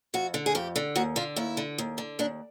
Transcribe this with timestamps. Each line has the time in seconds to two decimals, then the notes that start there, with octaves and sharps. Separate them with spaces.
0.14 F2 F#4
0.34 D3
0.46 G#4
0.55 F2 G4
0.76 D3
0.96 D#2 F#4
1.16 D3 F4
1.36 D#2 E4
1.57 D3
1.78 D#2
1.98 D3
2.19 D#2 D4